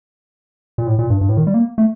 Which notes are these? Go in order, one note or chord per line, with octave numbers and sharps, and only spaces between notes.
A#2
A2
A#2
G2
G2
A2
D#3
G3
A#3
A3